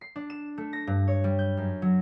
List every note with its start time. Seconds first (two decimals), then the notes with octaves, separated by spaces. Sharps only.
0.01 C7
0.16 D4
0.30 E7
0.58 A3
0.73 A#6
0.87 G2
1.08 C#5
1.24 G3
1.39 G6
1.57 F#2
1.82 F#3